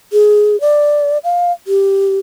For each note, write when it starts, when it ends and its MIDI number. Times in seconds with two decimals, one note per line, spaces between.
0.13 0.59 68
0.61 1.18 74
1.24 1.52 77
1.67 2.19 67